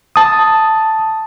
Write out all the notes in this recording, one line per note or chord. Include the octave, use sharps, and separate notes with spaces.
A5 D#6